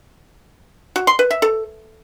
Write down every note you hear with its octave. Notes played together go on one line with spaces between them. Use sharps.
F#4
C6
B4
E5
A4